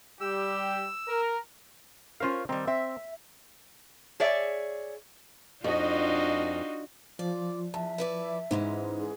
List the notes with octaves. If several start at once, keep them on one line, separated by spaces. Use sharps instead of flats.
G3 G4 E6
A#4
C#4 F4 A#4 C5 F5
D#3 G3 C4
C4 E5
G#4 C#5 D5 E5
F2 D4 D#4 F4 F#4 D#5
F3 F4 D5
E2 E5 A5
E4 B4 D5
G#2 E3 G#3 C#4
G#4